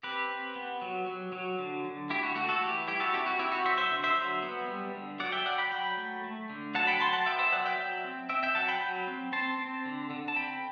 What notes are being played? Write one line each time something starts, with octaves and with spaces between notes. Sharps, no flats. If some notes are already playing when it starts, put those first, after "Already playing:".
C4 G4 B4
C4
B3
F#3
F#3
F#3
D3
D3
A3 E4 G4
F#4
A3 F#4
F#4 A4
E3 E4 G4
G3 E4 G4
F#4 A4
C4 E4 G4
F#4
C4 E4 G4
F#4
F#3 C5 E5
C5 E5
D3
C5 E5
F#3
B3
G3
D3
F#3 D5 F#5
E5 G5
F#3 D5 F#5
G5 B5
F#3 G5 B5
A3
A3
D3
F#3 F#5 A5
G5 B5
F#3 A5 C6
F#5 A5
B3 E5 G5
C5 E5
F#3 D5 F#5
E5 G5
F#3
C4
C4 E5 G5
E5 G5
F#3 F#5 A5
G5 B5
F#3
C4
C4 A5 C6
C4
D3
D3
A5
C4 G5 B5